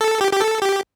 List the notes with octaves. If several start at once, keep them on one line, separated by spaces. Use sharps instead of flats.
A4
G4
G4
A4
G4